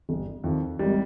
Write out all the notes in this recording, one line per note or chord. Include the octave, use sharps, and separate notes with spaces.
G1
F2 D#3
G#1 G3